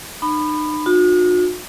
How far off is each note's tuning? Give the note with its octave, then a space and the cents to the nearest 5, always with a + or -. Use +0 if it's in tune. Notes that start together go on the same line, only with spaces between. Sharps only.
D#4 -40 B5 +10
D#4 -45 F#4 -45